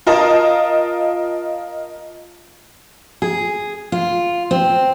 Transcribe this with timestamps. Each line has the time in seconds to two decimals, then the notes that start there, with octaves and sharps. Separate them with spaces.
0.07 F4 A#4 D#5 A5
3.22 G#4
3.92 F4
4.51 C4